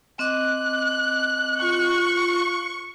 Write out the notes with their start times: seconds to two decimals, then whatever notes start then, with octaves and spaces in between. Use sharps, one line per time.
0.19 C4 D#5 D6 F#6
1.61 F4 C#6